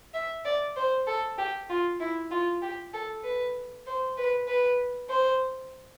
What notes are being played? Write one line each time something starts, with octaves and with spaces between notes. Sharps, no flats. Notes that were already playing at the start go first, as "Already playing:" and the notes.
E5
D5
C5
A4
G4
F4
E4
F4
G4
A4
B4
C5
B4
B4
C5